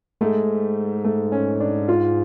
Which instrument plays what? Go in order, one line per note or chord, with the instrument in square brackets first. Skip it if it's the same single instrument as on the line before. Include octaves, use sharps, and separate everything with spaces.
[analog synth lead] G#2 [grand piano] A3
[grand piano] A3
C#4
D4
F4